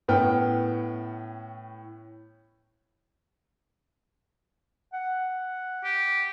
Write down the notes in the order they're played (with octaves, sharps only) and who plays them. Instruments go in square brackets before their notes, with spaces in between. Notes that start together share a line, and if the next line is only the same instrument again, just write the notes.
[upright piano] A2 B3 C#4 G5 F6
[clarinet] F#5
[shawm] G4